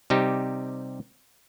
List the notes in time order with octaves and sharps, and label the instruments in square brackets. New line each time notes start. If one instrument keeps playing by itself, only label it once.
[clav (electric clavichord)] C3 G3 D#4 G4